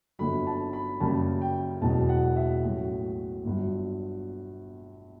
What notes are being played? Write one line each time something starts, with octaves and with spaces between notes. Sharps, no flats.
G1 G2 D3 F#3 B5
A5
B5
F#1 F#2 C#3 G3 A5
G5
E1 E2 B2 F#3 A5
F#5
E5
A1 A2 F#3
G1 G2 F#3